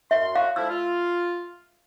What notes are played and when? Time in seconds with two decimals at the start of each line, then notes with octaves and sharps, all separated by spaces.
0.11 F#2 E5 C6
0.35 F#3 F#4 F5
0.56 D3 F3 E4 E6
0.69 F4